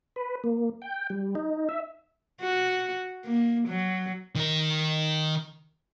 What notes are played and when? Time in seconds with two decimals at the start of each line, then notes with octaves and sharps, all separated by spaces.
0.16 B4
0.44 A#3
0.82 G5
1.10 G3
1.35 D#4
1.69 E5
2.41 F#4
3.25 A#3
3.68 F#3
4.35 D#3 A#4